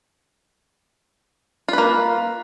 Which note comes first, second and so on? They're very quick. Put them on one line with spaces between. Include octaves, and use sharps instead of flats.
F4 B4 A#3